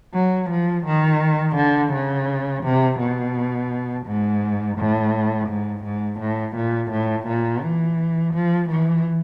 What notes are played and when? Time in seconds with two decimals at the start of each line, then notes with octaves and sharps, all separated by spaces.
0.14 F#3
0.50 F3
0.86 D#3
1.56 D3
1.93 C#3
2.64 C3
3.00 B2
4.07 G#2
4.78 A2
5.49 G#2
5.84 G#2
6.20 A2
6.56 A#2
6.91 A2
7.28 A#2
7.63 E3
8.34 F3
8.70 E3